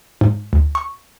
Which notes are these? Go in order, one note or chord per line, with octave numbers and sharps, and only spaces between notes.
G#2
D2
C#6